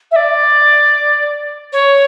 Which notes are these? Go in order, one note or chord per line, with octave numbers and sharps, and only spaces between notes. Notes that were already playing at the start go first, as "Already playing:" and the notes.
E5
D5
C#5